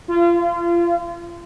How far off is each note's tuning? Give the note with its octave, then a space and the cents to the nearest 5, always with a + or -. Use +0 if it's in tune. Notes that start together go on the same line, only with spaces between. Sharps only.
F4 -30